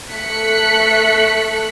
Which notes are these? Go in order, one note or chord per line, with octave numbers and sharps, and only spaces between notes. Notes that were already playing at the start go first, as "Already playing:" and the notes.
A3 F#6 B6 C#7